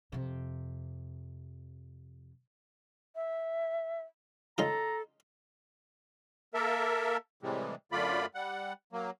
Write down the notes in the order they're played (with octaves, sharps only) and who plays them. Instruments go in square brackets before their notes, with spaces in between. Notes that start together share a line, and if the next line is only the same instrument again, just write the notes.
[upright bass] F2 C3
[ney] E5
[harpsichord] C#3 D#4 F4 [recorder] A4 [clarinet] A#5
[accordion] A#3 A4 A#4 E5
A2 C3 E3 G3 G#3
F#2 D3 A3 F4 D5 B5
G3 F#5
F#3 A#3